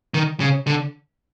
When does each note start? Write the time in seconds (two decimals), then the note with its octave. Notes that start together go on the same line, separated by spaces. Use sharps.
0.14 D#3
0.40 C#3
0.67 D3